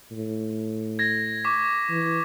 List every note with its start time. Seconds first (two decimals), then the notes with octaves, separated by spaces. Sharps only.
0.12 A2
0.99 G#6 A#6
1.44 C#6 D6 B6
1.90 E3